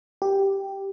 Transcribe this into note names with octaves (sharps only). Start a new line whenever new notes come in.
G4